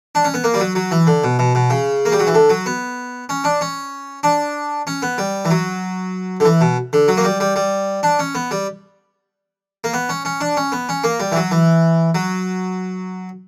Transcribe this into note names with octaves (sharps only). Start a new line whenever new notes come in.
D4
C#4
B3
A#3
G3
F#3
F#3
E3
D3
B2
B2
B2
C#3
A#3
G3
F#3
E3
D3
F#3
B3
C#4
D4
C#4
D4
C#4
B3
G3
E3
F#3
D3
E3
B2
D3
F#3
A#3
G3
G3
G3
D4
C#4
B3
G3
A#3
B3
C#4
C#4
D4
C#4
B3
C#4
A#3
G3
E3
F#3
E3
F#3